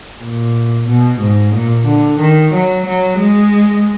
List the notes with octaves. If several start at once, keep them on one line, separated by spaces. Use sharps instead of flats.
A#2
B2
G#2
A#2
D3
D#3
F#3
F#3
G#3